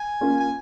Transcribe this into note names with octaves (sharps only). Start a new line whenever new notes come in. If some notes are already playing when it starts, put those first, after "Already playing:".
Already playing: G#5
A#3 C#4 F4
G#5